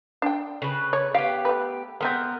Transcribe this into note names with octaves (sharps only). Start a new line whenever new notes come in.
D4 G5
C#3 B4
C#5
B3 G4 F5
A3 B4
G#3 B3 C4 A#4